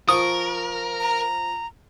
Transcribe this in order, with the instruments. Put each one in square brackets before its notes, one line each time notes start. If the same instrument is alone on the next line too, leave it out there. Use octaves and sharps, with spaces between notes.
[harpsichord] F3 C#6 [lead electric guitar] A#4 [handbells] D#6
[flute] A#5